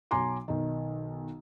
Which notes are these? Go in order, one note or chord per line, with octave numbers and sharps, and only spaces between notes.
B1 F#3 G#5 A#5 C6 D6
B1 D#3